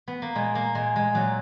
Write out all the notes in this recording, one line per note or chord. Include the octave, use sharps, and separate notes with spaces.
B3
A#3
A#2 G#3
A#3
A#2 G#3
G#3
A#2 F#3